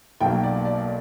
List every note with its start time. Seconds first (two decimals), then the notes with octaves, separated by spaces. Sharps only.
0.21 B1 B2 F#3 A#3 G5
0.44 D5
0.65 D5